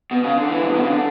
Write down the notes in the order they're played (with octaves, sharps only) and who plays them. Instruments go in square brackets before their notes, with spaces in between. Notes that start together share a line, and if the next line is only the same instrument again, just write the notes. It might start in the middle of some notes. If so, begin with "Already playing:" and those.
[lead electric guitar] B2
C#3
D3
E3
G#2
A2
B2
C#3
D3